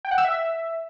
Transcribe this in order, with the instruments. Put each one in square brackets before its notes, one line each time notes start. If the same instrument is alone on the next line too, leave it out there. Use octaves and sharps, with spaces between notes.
[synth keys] G5
F#5
E6
E5